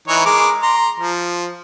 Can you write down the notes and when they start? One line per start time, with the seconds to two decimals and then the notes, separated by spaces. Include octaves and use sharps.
0.08 E3 D#4 C#5
0.26 G#3 A#4 D6
0.62 A#5 C6
1.00 F3